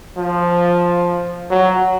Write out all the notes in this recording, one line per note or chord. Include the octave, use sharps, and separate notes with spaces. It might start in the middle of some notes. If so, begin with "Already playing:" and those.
F3
F#3